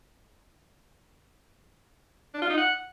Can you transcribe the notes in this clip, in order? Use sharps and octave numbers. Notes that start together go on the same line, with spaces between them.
D4
F4
D#4
F#5